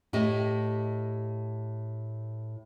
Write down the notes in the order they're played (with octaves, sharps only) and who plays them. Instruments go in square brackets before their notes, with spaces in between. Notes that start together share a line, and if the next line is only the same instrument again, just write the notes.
[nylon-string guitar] A2 G4 D#5